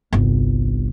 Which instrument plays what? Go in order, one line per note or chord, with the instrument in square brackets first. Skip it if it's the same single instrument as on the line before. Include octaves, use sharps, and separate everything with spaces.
[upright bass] G1 C2